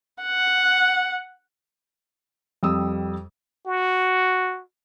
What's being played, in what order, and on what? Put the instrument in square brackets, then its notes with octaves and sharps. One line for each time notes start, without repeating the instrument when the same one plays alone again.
[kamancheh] F#5
[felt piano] F2 G3 D#6 E6
[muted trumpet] F#4